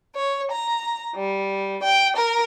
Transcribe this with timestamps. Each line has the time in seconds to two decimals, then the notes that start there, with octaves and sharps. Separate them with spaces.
0.15 C#5
0.51 A#5
1.14 G3
1.82 G5
2.16 A#4